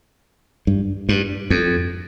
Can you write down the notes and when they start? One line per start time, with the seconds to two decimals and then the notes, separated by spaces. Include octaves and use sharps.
0.67 G2
1.09 G2
1.50 F2